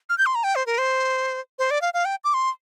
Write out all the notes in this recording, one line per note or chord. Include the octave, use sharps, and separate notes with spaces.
F6
G6
C6
A#5
G5
C5
A#4
C5
C5
D5
F5
F5
G5
D6
C6